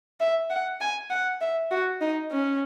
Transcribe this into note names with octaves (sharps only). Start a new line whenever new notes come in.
E5
F#5
G#5
F#5
E5
F#4
D#4
C#4